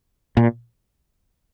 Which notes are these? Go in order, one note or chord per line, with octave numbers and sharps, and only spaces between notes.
A#2